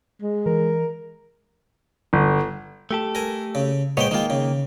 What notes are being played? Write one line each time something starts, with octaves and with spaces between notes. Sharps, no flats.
G#3
E3 A#4
G1
A3 G4 A4
A#4 G#5
C#3
A#2 G#3 B3 C5 C#5 G5
D#3 G#3 A#3 F4 G5
C#3